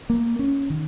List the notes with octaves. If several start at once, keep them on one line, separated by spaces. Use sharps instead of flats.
A#3
C#4
D#3